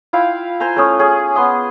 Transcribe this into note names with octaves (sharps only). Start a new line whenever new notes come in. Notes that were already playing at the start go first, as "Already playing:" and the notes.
E4 F4 F5 G5
C5 G#5 A#5
A3 C#4 D#6
C#4 G#4
B3 C6 D#6